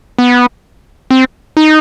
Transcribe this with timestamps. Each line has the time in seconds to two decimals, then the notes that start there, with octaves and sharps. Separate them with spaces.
0.19 B3
1.11 C4
1.57 D#4